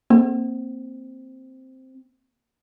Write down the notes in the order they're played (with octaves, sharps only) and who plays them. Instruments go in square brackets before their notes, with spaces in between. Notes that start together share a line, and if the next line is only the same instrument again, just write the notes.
[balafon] A#3 [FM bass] C4